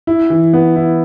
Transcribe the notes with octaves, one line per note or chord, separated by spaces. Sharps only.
E4
E3
B3
E4